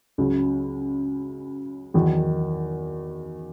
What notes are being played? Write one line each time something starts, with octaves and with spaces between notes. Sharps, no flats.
C#2 C#3 F#3
E2 D#3 F#3